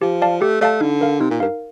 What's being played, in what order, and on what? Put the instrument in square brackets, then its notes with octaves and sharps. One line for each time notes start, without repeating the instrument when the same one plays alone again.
[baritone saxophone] F3 [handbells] G4
[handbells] D5 F5 A5
[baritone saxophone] A3 [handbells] G4
[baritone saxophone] A3 [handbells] D5 F5 A5
[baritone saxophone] D3 [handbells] D#4
[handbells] A#4 F5
[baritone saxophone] C3 [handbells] D#4
[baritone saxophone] A#2
[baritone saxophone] G2 [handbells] A#4 F5